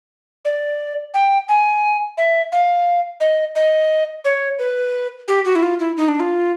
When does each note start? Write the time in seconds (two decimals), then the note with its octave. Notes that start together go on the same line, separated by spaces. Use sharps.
0.45 D5
1.14 G5
1.49 G#5
2.18 E5
2.52 F5
3.20 D#5
3.55 D#5
4.25 C#5
4.59 B4
5.28 G4
5.45 F#4
5.56 E4
5.63 F4
5.80 E4
5.97 D#4
6.08 D4
6.20 F4